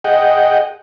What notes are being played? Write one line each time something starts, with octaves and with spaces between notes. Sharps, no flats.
G#4 D#5 F#5 G5